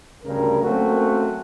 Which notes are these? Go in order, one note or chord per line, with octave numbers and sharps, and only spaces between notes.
D2 G2 C#3 A#4
F#3 A3 A#3 C4 C#4 F#4